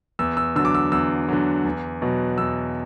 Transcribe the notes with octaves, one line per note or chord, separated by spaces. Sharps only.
E2 E6
E6
D3 F#3 E6
D6
E6
E2 E6
D3 F#3
E2
B2 F#3
E2 E6